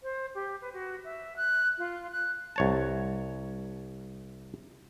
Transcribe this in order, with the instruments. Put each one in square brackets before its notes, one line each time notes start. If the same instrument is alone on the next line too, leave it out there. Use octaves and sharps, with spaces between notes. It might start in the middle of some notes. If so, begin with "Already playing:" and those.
[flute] C5
G4
B4
F#4
E5
F#6
F4
F#6
[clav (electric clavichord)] C2 C#5 A5